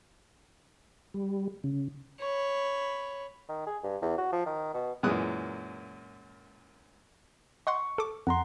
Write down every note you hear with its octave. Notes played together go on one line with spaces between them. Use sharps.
G3
C#3
C#5 B5
D#3
G#4
G2
E2
F#4
F3
D#3
B2
F#2 A#2 E3 G#3 D#6 F#6
D#5 F#5 C6 C#6
A4 D6
F2 F#5 A#5 C6